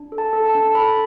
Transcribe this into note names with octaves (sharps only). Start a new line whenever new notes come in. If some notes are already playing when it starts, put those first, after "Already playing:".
Already playing: D4
A4
A5
A4
A5
D4
A4 B5